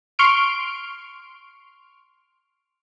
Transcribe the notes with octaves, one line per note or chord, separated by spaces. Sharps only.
C6 C#6 F6 D7